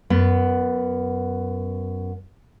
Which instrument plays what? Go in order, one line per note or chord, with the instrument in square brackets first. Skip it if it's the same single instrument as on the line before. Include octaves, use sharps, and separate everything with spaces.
[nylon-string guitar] F#2 B3